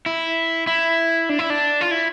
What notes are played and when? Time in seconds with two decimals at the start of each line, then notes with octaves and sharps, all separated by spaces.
0.06 E4
0.67 E4
1.29 D4
1.39 E4
1.50 D4
1.81 F4
1.91 E4